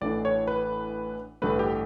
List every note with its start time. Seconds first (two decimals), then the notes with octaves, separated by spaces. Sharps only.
0.01 A1 A2 E3 A3 D4 D5
0.25 C#5
0.48 B4
1.42 A1 G2 D3 A3 B4
1.59 G4